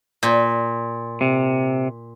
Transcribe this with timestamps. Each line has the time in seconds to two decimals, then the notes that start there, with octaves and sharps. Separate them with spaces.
0.23 A#2
1.21 C3